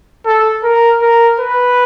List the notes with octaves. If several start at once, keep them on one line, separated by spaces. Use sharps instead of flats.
A4
A#4
A#4
B4